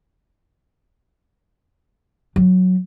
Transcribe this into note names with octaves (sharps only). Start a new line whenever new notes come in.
F#3